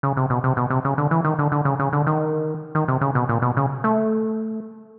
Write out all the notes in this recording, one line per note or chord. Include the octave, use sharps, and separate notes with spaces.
C#3
C3
B2
C3
B2
C3
C#3
D3
E3
D#3
D3
D3
C#3
C#3
D3
D#3
D#3
C3
C#3
B2
A#2
B2
C#3
A3